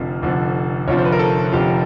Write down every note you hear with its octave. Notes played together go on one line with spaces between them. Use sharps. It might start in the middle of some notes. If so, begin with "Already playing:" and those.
Already playing: F1 F2 D3 F3
F1 F2 D3 F3
F1 F2 D3 F3 C#5
C5
B4
A#4
A4
F1 F2 D3 F3 G4